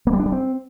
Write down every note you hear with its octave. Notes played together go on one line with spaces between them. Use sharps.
A#3
G3
D4
G3
C4